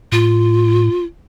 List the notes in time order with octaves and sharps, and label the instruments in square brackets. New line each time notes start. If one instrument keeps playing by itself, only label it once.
[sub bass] A2 [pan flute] F4